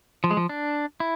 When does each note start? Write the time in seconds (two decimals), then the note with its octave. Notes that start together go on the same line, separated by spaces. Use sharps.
0.24 F3
0.31 G#3
0.37 F3
0.49 D4
1.00 E4